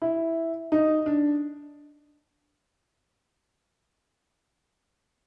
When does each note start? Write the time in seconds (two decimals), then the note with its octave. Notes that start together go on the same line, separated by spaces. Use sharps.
0.02 E4
0.72 D#4
1.06 D4